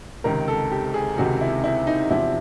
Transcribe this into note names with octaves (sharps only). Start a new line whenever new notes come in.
C#2 C3 D#3 A#4
A4
G4
G#4
C#2 C3 D#3 F#4
E4
E4
D#4
E2 C3 F3 E4